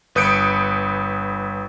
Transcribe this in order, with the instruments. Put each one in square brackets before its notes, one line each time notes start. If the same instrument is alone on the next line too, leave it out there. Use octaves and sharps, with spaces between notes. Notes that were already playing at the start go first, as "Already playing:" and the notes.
[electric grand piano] G1 B4 D#6 G6 C#7 D7